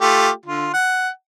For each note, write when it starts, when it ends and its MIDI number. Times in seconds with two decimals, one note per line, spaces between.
0.01 0.29 57
0.01 0.29 65
0.01 0.29 67
0.46 0.69 50
0.46 0.69 65
0.73 1.08 78